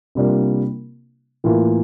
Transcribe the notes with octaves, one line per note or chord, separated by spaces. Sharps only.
C3 G3 A#3 D4 F4
A2 E3 A#3 F4